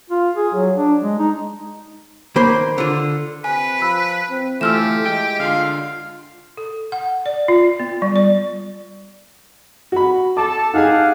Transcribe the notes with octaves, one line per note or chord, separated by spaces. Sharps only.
F4
G#4
F#3
D4
G#3
D#4
D#3 A#3 C5 B5
D3 F4
C3 B4 G#5
F3 B5 E6
C4
E3 A3 F4 G4 E6 F6 E7
G#3 G5
D3 F4 F5
A4
F#5
D5
F4
B3
G3
D5
F#4 B5
A4 A5 D6
D#4 G4 G#4 F5 F#5 G#5